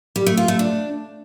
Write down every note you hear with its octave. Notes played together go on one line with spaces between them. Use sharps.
G3
A3
F4
A3
D4